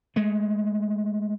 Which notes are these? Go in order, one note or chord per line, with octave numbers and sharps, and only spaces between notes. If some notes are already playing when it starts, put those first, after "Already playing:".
G#3 A3